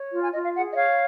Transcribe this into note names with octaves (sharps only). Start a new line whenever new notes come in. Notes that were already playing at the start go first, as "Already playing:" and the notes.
Already playing: C#5
F4
G#5
F4 D#5
F5
G#4 F#5
D#5
C#5 F5